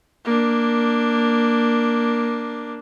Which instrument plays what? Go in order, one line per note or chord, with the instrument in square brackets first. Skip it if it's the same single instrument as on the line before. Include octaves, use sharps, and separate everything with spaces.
[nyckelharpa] A#3 D4